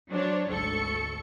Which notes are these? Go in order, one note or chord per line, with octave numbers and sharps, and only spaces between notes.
F#3 D4 C5 C#5
G#1 D2 A4 C#6 C#7